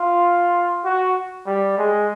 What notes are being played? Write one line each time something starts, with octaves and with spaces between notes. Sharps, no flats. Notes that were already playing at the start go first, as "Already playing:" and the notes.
Already playing: F4
F#4
G3
G#3